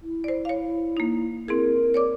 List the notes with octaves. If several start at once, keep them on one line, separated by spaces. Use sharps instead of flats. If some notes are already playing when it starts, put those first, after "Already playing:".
E4
C5 D5
C#5 F5
A#3 D#4
C4 E4 G#4 A#4
C#5 D5 D6